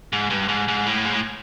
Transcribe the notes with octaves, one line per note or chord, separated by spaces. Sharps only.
G#2
G2
G#2
G#2
A2
G#2
A2